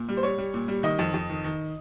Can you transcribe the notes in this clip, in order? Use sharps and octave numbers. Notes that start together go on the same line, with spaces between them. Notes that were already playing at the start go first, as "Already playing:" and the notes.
Already playing: A#2
G3
C5
G3 C#5
G3
A#2
G3
D#3 D#5
F2
F2
D#3
D#3